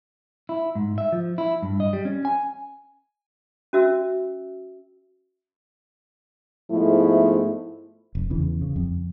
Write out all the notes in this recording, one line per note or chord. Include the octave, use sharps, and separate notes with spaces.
E4
G#2
E5
F3
E4
G2
D#5
G3
C#4
G#5
C#4 F#4 E5 E6
G#2 F3 A3 B3 E4
F1
E2 C#3 E3
C#3
F2